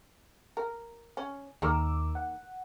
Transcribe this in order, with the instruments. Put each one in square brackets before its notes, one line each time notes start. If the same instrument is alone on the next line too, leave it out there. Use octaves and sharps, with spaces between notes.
[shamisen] A#4
C#4
[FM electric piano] D#2 D6 E6 [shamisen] D#3 A#3 A#4
[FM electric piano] F#5